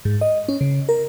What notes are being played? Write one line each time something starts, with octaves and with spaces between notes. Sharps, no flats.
G#2
D#5
C#4
C#3
A#4